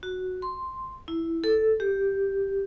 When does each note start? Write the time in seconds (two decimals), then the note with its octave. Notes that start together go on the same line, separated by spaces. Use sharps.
0.03 F#4
0.42 C6
1.08 E4
1.44 A4
1.80 G4